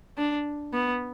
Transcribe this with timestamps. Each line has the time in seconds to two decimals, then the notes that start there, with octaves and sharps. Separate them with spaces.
0.18 D4
0.73 B3